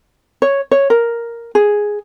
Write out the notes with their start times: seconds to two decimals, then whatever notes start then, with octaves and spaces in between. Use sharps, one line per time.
0.42 C#5
0.71 C#5
0.90 A#4
1.55 G#4